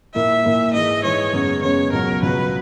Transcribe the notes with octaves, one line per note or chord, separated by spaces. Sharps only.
A#2 A#3 E4 E5
A#2 A#3 E4
G#2 E3 G#3 D#5
G#2 E3 G#3 C#5
F#2 C#3 G#3 B3
F#2 C#3 G#3 B3 C#5
C#2 B2 F#3 A#4
C#2 B2 F#3 B4